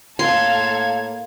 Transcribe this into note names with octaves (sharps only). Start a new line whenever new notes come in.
A2 A#3 A4 F5 C6 G#6